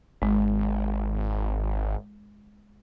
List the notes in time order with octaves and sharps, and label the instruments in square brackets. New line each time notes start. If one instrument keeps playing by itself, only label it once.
[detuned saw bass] G#1 [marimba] G#3